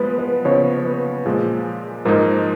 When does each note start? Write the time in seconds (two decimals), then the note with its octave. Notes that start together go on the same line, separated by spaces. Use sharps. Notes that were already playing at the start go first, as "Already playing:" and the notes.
Already playing: F3 G#3 B3 B4
0.18 B4
0.44 C#3 F3 B3 C#5
0.85 B4
1.25 A#2 F3 G#3 G#4
2.05 G#2 F3 G#3 D#4 A#4